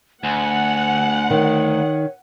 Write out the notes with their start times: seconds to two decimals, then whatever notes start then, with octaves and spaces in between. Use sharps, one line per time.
0.24 D2 F#5 G#5
1.30 D#3 C#5